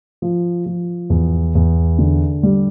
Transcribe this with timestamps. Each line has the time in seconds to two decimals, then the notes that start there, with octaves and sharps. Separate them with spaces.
0.22 F3
0.66 F3
1.10 E2
1.55 E2
1.99 D3
2.43 G3